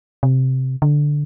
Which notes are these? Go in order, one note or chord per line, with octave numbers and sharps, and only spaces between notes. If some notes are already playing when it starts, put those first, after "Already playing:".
C3
D3